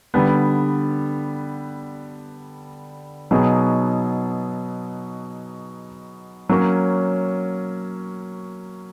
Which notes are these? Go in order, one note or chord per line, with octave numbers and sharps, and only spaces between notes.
D3 G3 B3
B2 F#3 B3 D#4 G#4
F#3 A#3 C#4